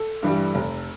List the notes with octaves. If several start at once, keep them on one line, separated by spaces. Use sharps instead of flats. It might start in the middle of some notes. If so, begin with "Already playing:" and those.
Already playing: A4
G2 E3 G3
F1